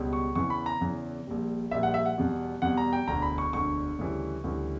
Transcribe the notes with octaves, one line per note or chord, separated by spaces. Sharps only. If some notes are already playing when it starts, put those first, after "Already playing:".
Already playing: C#2 B2 G3
C#6
E2 C#3 E3 C#6
B5
A#5
E2 C#3 E3
A#1 A#2 G3
A#1 A#2 G3 E5
F#5
E5
F#5
E2 B2 G3
E2 B2 G3 F#5
A#5
G5
E1 D2 D3 A#5
B5
C#6
E1 D2 D3 C#6
D2 C#3 E3 G3
D2 C#3 E3 G3